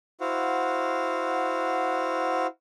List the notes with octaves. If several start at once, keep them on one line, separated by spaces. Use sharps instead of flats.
E4 F#4 C5 F5 F#5